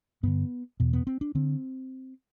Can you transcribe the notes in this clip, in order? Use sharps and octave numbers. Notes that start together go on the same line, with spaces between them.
G2 D3 B3
E2 B2
B3
C4
D4
D3 C4